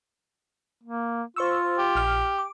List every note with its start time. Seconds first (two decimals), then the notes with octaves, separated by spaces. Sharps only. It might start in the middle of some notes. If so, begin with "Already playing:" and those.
0.83 A#3
1.36 F4 C5 C#6 E6
1.78 G4
1.95 A#1 F6
2.39 D6